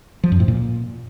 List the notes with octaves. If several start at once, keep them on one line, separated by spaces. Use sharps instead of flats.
F3
F#2
A2
A#2